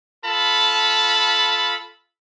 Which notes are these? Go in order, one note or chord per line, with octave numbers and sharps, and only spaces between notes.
F4 A4 A5 B5